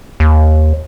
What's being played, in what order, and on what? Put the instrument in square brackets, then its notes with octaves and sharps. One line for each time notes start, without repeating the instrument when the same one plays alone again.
[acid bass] D#2